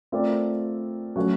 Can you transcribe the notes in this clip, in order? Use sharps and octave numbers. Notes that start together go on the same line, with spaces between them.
A3 C4 F4 A#4 D5
F#3 A3 C#4 F#4